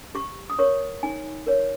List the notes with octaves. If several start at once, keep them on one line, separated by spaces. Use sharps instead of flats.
G4 C#6
D#6
A#4 C#5 C#6
D#4 G#5
A#4 C#5